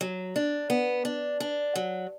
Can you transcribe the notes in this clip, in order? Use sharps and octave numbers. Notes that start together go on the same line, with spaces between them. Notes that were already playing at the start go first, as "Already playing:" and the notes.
F#3
D4
B3
D4
D4
F#3